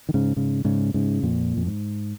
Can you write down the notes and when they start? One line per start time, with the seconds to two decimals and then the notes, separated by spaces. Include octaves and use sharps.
0.09 D#3
0.14 G#2 C#3
0.36 G#2 C#3
0.65 G#2 C#3
0.94 G#2 C#3
1.23 F2 A#2
1.57 F2
1.66 G#2